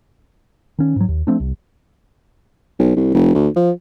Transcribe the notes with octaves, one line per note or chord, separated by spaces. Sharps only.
D#3 C#4
G#2 F#3
D#2
F3 A3 C4 D4
C2
B1
C2
F1
D2
F3